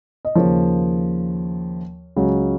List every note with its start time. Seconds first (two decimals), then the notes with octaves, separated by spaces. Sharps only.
0.25 D#5
0.35 D#2 C#3 F3 A#4 C#5
2.16 C#2 C#3 F#3